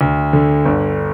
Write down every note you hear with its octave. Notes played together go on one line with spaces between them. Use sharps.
D2
D3
G1